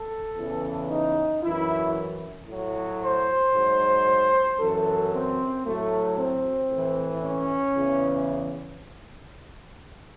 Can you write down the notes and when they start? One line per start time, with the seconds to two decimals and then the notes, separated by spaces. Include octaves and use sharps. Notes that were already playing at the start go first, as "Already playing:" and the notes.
Already playing: A4
0.36 E2 C#3 E3
0.90 D#4
1.42 F#2 E3 E4
2.47 A2 F#3
3.01 C5
3.53 G#2 F#3
4.58 F#2 E3 A4
5.11 C4
5.63 A2 F#3 A3
6.17 C4
6.69 A2
6.74 E3
7.22 C#4
7.75 E2 C#3 E3